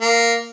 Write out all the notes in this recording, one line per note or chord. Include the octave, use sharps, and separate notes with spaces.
A#3